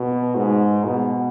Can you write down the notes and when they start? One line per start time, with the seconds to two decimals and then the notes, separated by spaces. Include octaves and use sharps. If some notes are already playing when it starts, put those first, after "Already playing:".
Already playing: B2
0.35 G#2
0.85 B2